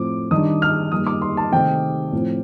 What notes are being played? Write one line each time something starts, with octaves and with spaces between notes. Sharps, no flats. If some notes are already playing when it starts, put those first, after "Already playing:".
Already playing: A2 F3 C4 D6
D#3 G3 D4 D#6
F6
D#3 G3 A#3 D#6
D6
C6
A5
C3 D#3 A3 C4 G5
A2 F3 C4